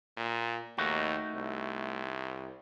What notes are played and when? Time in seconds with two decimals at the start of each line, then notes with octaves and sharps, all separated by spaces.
0.17 A#2
0.78 D#2 A3 D#4 F#4
1.35 C2